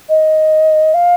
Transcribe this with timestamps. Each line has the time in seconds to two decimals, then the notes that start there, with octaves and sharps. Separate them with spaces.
0.09 D#5
0.94 F5